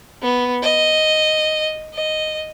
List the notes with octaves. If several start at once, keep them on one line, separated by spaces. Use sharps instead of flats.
B3
D#5
D#5